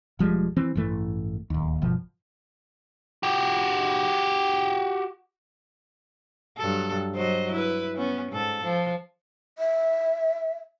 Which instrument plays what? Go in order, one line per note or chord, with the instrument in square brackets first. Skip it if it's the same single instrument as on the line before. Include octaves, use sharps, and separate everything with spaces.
[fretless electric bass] E1 F3 G3 G#3
E3 C4
A1 G2 E3 A3
D1 D#2
G1 B2 F3
[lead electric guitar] F#4 G4
[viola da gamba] G2 F#3 A4
F#3 C5 D#5
E4 B4
B3 C#4
G#2 A4
F3
[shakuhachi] E5